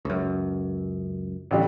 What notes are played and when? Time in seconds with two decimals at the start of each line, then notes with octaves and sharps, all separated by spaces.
0.05 C#2 F#2
1.51 A1 D3 G3